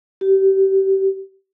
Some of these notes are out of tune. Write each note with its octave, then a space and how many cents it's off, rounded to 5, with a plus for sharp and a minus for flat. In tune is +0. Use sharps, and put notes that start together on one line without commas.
G4 -25